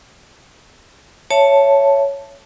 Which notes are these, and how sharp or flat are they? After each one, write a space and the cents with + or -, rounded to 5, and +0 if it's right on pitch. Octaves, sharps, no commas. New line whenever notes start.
C#5 +5 E5 +25 A5 +0